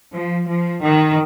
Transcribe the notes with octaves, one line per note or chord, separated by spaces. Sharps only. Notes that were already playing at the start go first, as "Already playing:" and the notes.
F3
F3
D#3